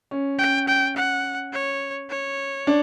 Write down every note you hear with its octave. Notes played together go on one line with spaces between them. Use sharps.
C#4
C#4 G5
G5
F#5
C#5
C#5
D4